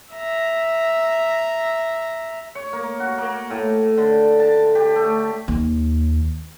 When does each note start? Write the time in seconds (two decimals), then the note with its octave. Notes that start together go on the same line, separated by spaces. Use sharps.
0.13 E5 A#5
2.55 C#5
2.73 A#3
3.00 F#4
3.18 A#3
3.50 A2
3.98 D3
4.40 A5
4.75 G4
4.96 A3
5.48 D#2